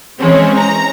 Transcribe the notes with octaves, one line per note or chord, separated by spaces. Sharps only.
E3 G#3 C4 C#4
A#5